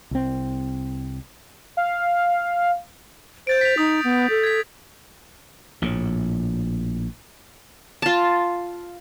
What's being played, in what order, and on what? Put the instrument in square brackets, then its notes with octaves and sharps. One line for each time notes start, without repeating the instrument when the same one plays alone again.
[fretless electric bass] C2 C4
[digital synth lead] F5
[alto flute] C5 [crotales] G6 A6 D7
[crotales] B6 F7
[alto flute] D#4 [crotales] D#6
[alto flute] B3
A4
[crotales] G#6 B6
[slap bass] A#1 A2
[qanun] F4 A5